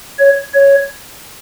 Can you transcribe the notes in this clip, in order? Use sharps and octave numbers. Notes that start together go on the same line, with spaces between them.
C#5
C#5